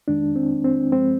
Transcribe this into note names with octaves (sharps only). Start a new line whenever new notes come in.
F2 D#3 G#3 D4
C4
C4
G2 F3 G#3 C4